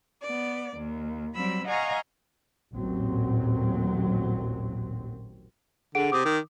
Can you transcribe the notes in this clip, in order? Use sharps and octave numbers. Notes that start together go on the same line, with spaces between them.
B3 D5
D#2
F#3 G3 C4 B5 E6
D#5 F5 F#5 G#5 A#5 C#6
A1 D#2 A#2 F#3 C4
D3 G#4 F#5 D7
C3 D6 D#6
D#3